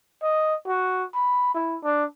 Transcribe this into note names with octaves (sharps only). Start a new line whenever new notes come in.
D#5
F#4
B5
E4
D4